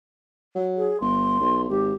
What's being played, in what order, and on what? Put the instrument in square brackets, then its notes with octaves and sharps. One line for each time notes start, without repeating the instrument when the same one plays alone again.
[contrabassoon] F#3
[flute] G#4
[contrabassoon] G1 [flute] C6
[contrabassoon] B1
[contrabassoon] G#1 [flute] G4